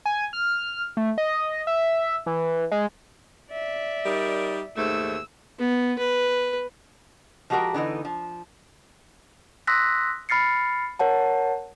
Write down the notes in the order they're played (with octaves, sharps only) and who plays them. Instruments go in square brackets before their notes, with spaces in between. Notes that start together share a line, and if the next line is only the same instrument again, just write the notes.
[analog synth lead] G#5
F6
A3
D#5
E5
E3
G#3
[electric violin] D5 E5
[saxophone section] G3 D#4 A#4
[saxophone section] D#2 G#2 A3 [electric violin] E6
[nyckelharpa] B3
B4
[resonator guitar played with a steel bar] F3 G#3 F#4 G4 A#4 A#5
D3 E3 B3 D#4
F3
[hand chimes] C6 D#6 E6 F#6 A#6 B6
B5 F6 A6 C7 C#7
A#4 C#5 F#5 A5